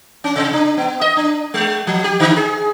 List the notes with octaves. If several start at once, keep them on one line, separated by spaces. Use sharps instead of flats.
C#4
C3
D4
B3
D#5
D4
G#3
F3
G4
D3
G#4